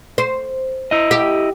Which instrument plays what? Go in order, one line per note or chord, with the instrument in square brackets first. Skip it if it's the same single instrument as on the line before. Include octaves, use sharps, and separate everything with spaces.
[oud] C5
[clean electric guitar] E4 D#5
[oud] G4